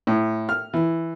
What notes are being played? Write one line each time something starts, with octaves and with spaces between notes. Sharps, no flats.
A2
F6
E3